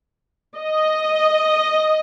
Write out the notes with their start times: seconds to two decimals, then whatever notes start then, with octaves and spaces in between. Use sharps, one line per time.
0.57 D#5